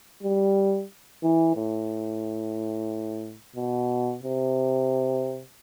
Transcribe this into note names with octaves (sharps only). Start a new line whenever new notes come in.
G3
E3
A2
B2
C3